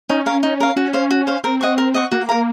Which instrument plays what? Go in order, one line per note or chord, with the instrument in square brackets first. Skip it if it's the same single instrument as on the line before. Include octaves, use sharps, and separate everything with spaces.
[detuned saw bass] C#4 [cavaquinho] D#4
[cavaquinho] A#4 F5
D#4
A#4 F5
[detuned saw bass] C#4 [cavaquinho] F#4
[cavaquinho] C5 F5
F#4
C5 F5
[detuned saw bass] C4 [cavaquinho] A#4
[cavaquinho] D#5 F#5 C#6
A#4
D#5 F#5 C#6
[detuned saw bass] A#3 [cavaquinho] F#4
[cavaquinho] A#4 F5 A#5